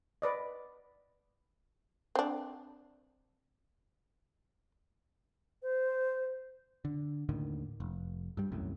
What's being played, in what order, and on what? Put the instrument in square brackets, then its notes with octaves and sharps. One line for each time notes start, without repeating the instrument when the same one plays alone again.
[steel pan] B4 D5 D#5
[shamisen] C4 D4
[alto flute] C5
[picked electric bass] D3
D#2 A2 D3 D#3
F1
G2 G3
E1 C2 F#2 A2